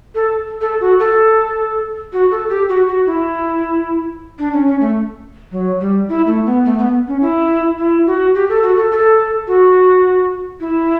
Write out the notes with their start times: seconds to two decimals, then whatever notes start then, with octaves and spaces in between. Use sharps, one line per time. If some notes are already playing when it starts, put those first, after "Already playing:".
0.15 A4
0.61 A4
0.81 F#4
1.00 A4
2.13 F#4
2.31 A4
2.49 G4
2.69 F#4
2.88 F#4
3.07 E4
4.39 D4
4.53 C#4
4.67 C#4
4.81 A3
5.52 F#3
5.80 G3
6.09 E4
6.27 A3
6.46 B3
6.65 A3
6.78 B3
7.08 C#4
7.22 E4
7.78 E4
8.07 F#4
8.35 G4
8.49 A4
8.63 F#4
8.77 A4
8.91 A4
9.48 F#4
10.60 E4